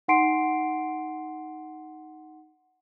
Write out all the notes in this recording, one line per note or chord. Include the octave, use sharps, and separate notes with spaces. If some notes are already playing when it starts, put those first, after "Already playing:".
D#4 F#5 G#5 C6 C7 D7